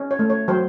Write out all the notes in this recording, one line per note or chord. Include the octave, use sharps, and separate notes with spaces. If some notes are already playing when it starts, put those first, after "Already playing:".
Already playing: C#4
C#5
A3
C#5
F#3 C5